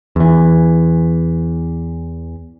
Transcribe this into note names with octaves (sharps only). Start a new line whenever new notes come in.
E2 E3